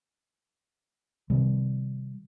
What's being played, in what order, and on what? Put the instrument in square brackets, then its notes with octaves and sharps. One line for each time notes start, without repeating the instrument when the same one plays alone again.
[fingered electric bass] C3 D#3 G3